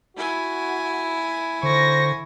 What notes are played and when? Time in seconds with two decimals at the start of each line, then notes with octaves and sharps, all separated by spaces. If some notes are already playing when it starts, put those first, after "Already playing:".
0.16 E4 F#4 G#5
1.63 D3 C5 C#6 A#6